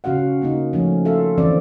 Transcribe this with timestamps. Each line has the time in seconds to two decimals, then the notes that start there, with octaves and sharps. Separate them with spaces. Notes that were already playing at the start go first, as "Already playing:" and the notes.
0.04 C#3 C#4 F#4 F5 F#5
0.42 C#3 A#3 D#4
0.73 F3 A3 C#4
1.05 F4 A4 A#4 E5 F5
1.38 D3 E3 A#3 C4 C#4 D5